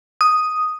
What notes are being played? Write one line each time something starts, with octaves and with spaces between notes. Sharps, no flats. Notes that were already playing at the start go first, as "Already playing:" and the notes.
D#6